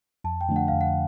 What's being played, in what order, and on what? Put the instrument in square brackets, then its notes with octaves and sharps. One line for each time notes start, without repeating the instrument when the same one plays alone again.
[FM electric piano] F2 [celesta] A5
[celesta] G5
[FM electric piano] D3 F3 A3 D4
[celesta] F#5
[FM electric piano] F2 [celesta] F5
[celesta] F#5